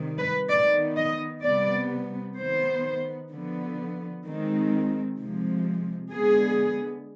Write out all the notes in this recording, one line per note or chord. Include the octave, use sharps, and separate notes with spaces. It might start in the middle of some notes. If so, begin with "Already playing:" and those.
Already playing: C3 D#3 G3
B4
D#3 B3 D5
D#5
C3 G3 B3 D5
D#3 B3 C5
D3 F3 B3
D#3 G#3 C4
C3 F3 G#3
D3 G#3 B3 G#4